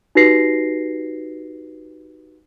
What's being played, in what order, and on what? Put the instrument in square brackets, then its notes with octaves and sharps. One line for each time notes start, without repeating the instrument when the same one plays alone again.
[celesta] D#4 F#4 G4 B4 A#6 C7